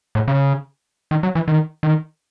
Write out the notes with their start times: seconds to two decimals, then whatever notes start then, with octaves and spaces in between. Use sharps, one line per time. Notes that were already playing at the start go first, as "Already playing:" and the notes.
0.15 A2
0.28 C#3
1.11 D#3
1.23 F#3
1.35 E3
1.48 D#3
1.83 D#3